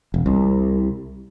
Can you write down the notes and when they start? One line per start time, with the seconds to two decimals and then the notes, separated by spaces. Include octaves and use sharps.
0.14 E1
0.26 C2